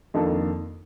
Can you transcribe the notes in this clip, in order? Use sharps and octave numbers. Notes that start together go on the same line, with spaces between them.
F2 D#3 A#3 D4 A4